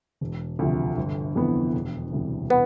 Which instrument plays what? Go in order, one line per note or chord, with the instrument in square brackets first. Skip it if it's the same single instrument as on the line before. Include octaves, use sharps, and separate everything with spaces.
[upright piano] E1
D2 C3 F3
G1
F2 E3 B3
E1
D2 C3 E3 G3
[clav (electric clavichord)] B3